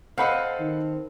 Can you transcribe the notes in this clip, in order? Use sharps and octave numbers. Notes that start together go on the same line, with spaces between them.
C4 A4 D#5 F5 F#5 B5
D#3